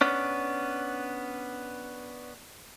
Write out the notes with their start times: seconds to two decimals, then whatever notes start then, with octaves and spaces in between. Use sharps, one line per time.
0.01 B3 C#4 D4